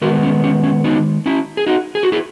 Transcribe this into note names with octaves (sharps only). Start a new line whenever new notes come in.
D#3 G#3 B3 F#4 A#4
C#4
C#4
C#4
B3 D#4
C#4 E4
G#4
D#4 F#4
G#4
F#4
E4 G#4